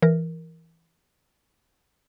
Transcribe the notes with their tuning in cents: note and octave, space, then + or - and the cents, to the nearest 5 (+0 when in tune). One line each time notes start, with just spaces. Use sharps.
E3 +0 A#4 +0